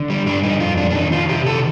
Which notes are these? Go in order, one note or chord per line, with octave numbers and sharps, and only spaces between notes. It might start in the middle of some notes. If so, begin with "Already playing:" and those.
Already playing: D3
G3
G2 D4
D#4
F2 F4
D4
D4
D#3 D#4
F4
C3 G4
A4